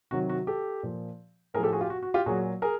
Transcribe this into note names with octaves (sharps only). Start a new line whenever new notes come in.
C3 D#3 F#3 F#4
F#4
G4 A4
A#2 F3
A2 F3 G#4 A#4
G4 A4
F#4 G#4
F4 G4
F#4
F#4
F4 G4
A#2 F#3 F#4 G#4
G#4 A#4